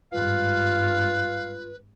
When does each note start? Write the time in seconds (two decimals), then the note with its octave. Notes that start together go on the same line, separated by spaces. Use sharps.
0.12 G#1 G2 F4 B4 F5